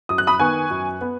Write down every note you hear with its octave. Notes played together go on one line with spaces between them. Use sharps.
F#2 D#6
F#6
B5 D#6
D#3 B3 G#5 C#6
F#2
B3